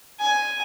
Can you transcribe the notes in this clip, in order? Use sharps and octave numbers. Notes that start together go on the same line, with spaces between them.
G#5